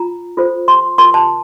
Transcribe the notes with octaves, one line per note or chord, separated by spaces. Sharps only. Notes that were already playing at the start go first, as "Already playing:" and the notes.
Already playing: F4 A#5
F4 A4 C5
C6
F4 A#4 C6
A5